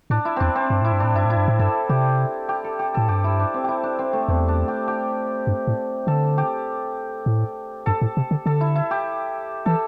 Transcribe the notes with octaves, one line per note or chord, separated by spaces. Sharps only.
A2 D4
E4
E2 C4 D4
C4
G2
A2 E4
G2
A2 D4
G2 E4
A2 E4
G2
A2
G2 A4
C3 G4
G4
A4
G4
A2 A4
G2 G4
E4
D4
C4
E4 G4
D4
C4
A3
E2 C4
D4
G4
G4
G2
A2
D3 A4
G4
A2
G2 A4
A2
C3
D3
D3 A4
E4
E4
G4
E3 A4